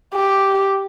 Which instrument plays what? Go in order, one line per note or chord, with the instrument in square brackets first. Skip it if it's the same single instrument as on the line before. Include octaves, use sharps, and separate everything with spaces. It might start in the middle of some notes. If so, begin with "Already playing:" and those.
[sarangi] G4